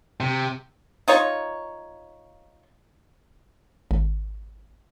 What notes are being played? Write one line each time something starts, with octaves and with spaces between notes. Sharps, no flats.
C3
D#4 F4 C#5
G#1